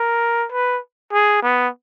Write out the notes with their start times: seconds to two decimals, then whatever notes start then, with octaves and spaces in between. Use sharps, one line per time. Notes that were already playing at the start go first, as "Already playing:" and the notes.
Already playing: A#4
0.52 B4
1.13 G#4
1.42 B3